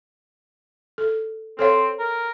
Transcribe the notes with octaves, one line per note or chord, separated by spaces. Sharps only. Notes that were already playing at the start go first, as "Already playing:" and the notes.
A4
C4 A4 C#5 F5
A#4